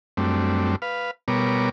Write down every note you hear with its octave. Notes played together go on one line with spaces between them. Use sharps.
F#2 G3 A3 C4 D4
B4 F5
B2 G3 B3 A#4 C#5 D6